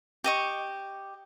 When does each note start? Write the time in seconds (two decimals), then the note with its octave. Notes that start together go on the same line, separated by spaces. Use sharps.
0.24 G4 D#5 C#6